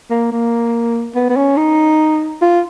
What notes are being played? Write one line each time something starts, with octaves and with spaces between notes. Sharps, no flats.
A#3
A#3
B3
B3
C#4
D#4
F4